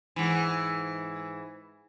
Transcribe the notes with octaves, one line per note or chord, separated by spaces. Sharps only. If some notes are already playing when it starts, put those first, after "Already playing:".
G#2 E3